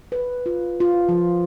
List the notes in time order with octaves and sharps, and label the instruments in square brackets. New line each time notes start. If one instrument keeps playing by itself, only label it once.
[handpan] B4
F4
F4
F3